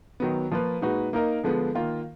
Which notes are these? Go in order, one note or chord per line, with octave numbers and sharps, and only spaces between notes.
D#3 F#3 B3
F3 A#3 F4 B4
A#2 G#3 D#4 F#4 B4
A#3 D#4 A#4 D#5
D3 F3 G#3 B3
D#3 A#3 F4